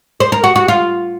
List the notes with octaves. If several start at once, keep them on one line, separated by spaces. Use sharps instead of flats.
C5
A#4
F#4
F#4
F4